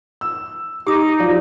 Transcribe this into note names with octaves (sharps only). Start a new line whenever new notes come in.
E6
D#4 G4 D6 D#6
F3 F#3 D5